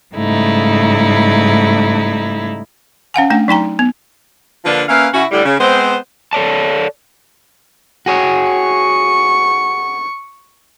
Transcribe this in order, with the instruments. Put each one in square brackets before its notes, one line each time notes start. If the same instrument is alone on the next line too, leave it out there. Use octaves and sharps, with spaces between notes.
[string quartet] G#2 C#3 G3 A3 D#4 E4
[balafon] C#4 F5 F#5 G#5
A3 D4 G5
F#3 D#4 G5 A#5
B3
[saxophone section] D3 F3 A#3 D4 F4 B4
A#3 C#4 B4 E5 F5
C#3 C#4 E4 F#4
A2 D3 G3
C#3
G#3 B3 C4 C5
[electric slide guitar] A4 C#5 D5 A5
[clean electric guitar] F#4 G#4 C#5
[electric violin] C#6